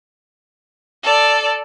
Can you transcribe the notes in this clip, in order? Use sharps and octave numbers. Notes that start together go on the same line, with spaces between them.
A4 D5